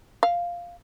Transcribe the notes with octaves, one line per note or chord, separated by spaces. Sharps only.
F5